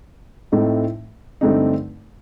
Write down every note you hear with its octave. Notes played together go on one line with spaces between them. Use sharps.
A2 A3 C4 D#4
G2 D3 A3 C4 D#4